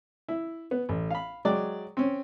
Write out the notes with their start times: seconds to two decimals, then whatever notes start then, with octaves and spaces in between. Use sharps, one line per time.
0.28 E4
0.71 B3
0.89 A1
1.11 F5 B5
1.45 F#3 G#3 D5 G5 D6
1.97 C4 C#4